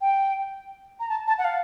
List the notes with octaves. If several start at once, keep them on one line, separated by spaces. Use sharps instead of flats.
G5
A#5
A5
A5
F#5
F5